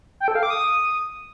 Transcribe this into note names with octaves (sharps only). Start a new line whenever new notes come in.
G5
A4
F5
D6
D#6